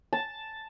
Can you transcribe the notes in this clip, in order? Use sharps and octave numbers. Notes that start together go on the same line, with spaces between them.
A5